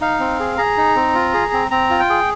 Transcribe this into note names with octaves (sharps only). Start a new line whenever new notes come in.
D#4 F5
C4
G#4
G#4 A#5
D#4
C4
F4
G#4
C4
C4 A#5
F4
G5
G#4